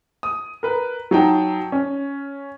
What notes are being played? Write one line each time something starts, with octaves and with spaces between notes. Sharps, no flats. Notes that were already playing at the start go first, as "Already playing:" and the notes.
D#6
A#4 B4
F#3 D#4 G5 A5
C#4